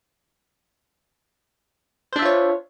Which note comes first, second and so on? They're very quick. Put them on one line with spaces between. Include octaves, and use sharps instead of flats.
C5 D4 E5 F4 C#5